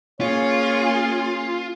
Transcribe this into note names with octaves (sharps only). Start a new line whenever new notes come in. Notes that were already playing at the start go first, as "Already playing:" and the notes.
A#3 C#4 F4 G#4 C#5